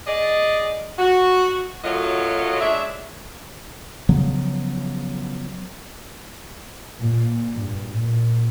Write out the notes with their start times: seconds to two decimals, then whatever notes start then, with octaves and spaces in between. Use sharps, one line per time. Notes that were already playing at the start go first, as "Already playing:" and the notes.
0.07 G#4 D5 D#5
0.98 F#4
1.84 F#2 F#3 A3 F4 C#5 D#5
2.61 G#3 D4 C#5 E5
4.09 C#3 F3 F#3 B3
6.99 A#2
7.56 G2
7.96 A#2